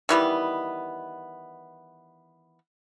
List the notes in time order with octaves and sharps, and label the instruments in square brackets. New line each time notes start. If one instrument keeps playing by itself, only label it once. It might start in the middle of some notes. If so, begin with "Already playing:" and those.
[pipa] D#3 E3 G3 B3